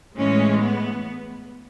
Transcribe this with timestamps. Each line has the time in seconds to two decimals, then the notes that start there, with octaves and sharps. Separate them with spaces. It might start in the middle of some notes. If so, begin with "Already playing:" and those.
0.18 A2 E3 G#3 C#4
0.61 B3